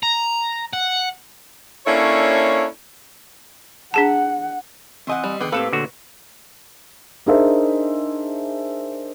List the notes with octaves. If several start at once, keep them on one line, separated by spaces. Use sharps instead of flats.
A#5
F#5
A#3 C#4 D4 E4 A4 C#5
D4 G#4 F#5 A5
E3 C4 D#5 F#5 G#5
G3
D3 D#3 B3 G#4 G5
A2 A#3 C4 G4 A4 B4 F5
D2 A#2 D3 F#4 C#5
D4 D#4 G#4 A#4 C5 E5